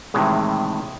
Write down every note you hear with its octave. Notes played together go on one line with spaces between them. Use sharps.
A2 C3 D#3 E3 G#3